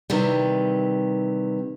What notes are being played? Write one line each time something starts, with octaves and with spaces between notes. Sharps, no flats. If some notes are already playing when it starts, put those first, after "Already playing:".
C3 D#3 E3 G3